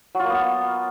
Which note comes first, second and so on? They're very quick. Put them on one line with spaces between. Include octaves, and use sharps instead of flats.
F#3 F4 A#3 B3